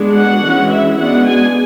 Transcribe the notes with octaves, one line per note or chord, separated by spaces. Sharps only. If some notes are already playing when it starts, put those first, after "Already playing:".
Already playing: G#3 B3 D4
F#4 F#5
E3 G#3 C#4
E4 E5
G#3 B3 D4 F#4 F#5
G#4 G#5